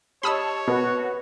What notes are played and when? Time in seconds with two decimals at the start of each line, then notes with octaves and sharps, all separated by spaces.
0.23 G4 C#5 D#5 A5 B5 D#6 E6
0.68 B2 F#4 B4